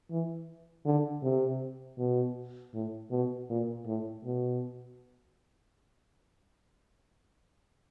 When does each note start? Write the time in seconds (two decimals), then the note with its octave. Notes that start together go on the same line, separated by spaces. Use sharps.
0.10 E3
0.86 D3
1.23 C3
1.98 B2
2.74 A2
3.11 B2
3.50 A#2
3.86 A2
4.25 B2